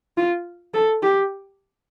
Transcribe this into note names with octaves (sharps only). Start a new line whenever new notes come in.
F4
A4
G4